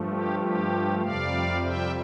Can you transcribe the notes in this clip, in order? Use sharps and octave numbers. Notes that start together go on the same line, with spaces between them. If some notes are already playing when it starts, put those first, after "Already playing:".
Already playing: G2 F3 A3
G4
G4
F2 C3 G3 D5 F5
E5 G5